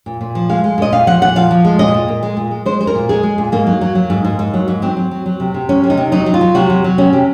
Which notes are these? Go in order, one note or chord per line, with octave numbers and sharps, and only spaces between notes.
A#2
A#2
F3
G#3 F5
G#3
A#2 D#5
A#2 F5
F3 F#5
A#2 F#5
F3 F5
F3
G#3
A#2 D#5
A#2
A#2
G#3
A#2
G#3
G#3 C5
G#3 C5
A#4
A#2
G#3 G#4
G#3
A#2
G#2 A#3
F#3
F#3
F#3
G#2
G#2
G#2
F#3
G#2
F#3 C4
F#3
F#3
F#3
C3
C3
F#3 C#4
C3
D#4
C3
F#3 D#4
F#3
F4
F#3
C3 F#4
F#3
F#3
C3 C#4
C3